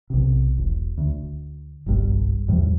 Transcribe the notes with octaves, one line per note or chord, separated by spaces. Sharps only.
B1 C3
E1
D2
F#1 B1 G2
E2 A2 F3 G3